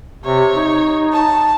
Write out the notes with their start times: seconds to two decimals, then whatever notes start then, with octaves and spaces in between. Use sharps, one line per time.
0.24 C3 C#5
0.55 D#4
1.13 A5